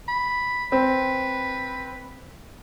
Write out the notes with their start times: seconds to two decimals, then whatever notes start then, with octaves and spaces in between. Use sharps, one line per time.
0.08 B5
0.72 C4 B4